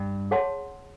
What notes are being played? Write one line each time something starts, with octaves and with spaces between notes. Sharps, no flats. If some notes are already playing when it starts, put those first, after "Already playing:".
Already playing: G2
G#4 C#5 F#5 A5 C6